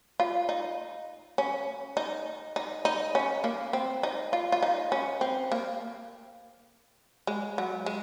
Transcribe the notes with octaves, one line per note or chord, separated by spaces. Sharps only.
F4
D#4
C#4
D#4
D#4
D#4
C#4
A#3
C4
D#4
F4
F4
D#4
C#4
C4
A#3
G#3
F#3
G#3